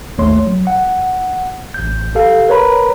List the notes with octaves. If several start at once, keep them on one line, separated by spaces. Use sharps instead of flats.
G#1 D#2 A3 C#5 C6
F#3
F#5
A1 G6
G4 A4 F5
A#4 B4 C#5 A#5 B5